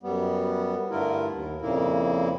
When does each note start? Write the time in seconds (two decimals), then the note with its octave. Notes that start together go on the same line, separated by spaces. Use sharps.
0.03 F#2 G3 B3
0.91 G2 D3 A3 E4 F4 A#4
1.31 D#2
1.62 F2 A#2 C#3 A#3 E4